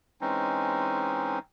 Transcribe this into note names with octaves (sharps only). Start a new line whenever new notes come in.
E3 G#3 C4 C#4 D#4